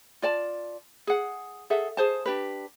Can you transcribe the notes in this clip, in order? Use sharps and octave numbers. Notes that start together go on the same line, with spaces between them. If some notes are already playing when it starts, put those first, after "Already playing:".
F4 D5 A5
G#4 F#5
G#4 A4 E5 F#5
G#4 C5 A5
D4 G4 B4